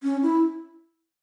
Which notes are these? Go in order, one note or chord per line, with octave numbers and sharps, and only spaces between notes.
C#4
E4